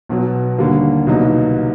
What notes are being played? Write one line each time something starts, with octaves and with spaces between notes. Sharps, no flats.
B1 B2 F#3
D#2 D3 G3 A#3
C2 B2 F#3 A#3 D#4